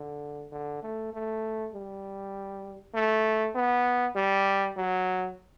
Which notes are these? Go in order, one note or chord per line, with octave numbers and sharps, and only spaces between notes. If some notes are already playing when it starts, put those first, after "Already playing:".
Already playing: D3
D3
A3
A3
G3
A3
B3
G3
F#3